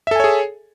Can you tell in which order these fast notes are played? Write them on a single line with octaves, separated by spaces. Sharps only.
E5 A4 G#5 C#5 G#4